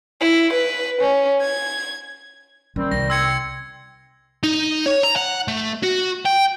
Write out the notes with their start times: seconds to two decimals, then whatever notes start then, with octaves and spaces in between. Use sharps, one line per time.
0.21 E4
0.53 B4
1.02 C#4
1.42 G#6
2.76 D#3 G3 C4 C#4
2.91 C2 A#6
3.10 G5 C6 E6 G#6 C#7
4.43 D#4
4.86 C#5
5.03 A#5
5.16 F#5
5.48 A3
5.83 F#4
6.25 G5